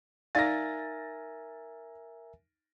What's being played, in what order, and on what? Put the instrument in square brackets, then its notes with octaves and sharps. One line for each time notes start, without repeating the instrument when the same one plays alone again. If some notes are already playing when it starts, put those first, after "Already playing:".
[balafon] D#4 D5 F5 [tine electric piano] A#4 E5 G#5 [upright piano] A6 A#6